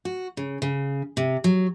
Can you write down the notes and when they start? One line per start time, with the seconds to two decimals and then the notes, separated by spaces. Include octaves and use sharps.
0.05 F#4
0.37 C#3
0.62 C#3
1.17 C3
1.44 F#3